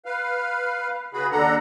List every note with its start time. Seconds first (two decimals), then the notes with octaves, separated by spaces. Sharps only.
0.05 B4 F5
1.13 C#3 F#4 G#4 B4 B5
1.31 D#2 D4 A4 F#5 A#5